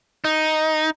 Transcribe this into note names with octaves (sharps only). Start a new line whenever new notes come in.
D#4